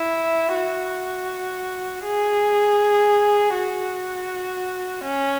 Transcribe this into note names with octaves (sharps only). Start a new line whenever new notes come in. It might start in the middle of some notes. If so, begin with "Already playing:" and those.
Already playing: E4
F#4
G#4
F#4
C#4